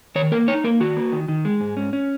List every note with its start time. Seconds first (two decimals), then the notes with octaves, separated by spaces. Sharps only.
0.15 D#3 C#5
0.31 A#3 A#4
0.48 D#4 C#5
0.64 A#3 A#4
0.80 D#3 F#4
0.97 A#3
1.12 D#3
1.28 D#3
1.45 G#3
1.61 G#2
1.77 C#4
1.93 C#4